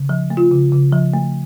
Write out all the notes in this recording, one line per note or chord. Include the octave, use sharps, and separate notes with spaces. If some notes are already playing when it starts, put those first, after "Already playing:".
Already playing: C#3
F3
A3
F4
C#3
C#3
F3
A3